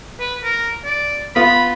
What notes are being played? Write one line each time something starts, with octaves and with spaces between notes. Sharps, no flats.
B4
A#4
D5
B3 F4 B5